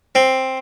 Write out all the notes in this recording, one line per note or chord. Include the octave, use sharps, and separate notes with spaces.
C4